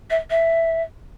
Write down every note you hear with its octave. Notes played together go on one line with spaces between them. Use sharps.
E5
E5